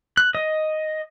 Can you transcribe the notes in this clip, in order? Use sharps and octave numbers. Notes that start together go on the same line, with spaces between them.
F#6
D#5